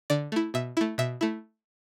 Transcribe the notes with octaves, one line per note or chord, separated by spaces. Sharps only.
D3 D5
A3 E4
B2 E5
A3 E4
B2 E5
A3 E4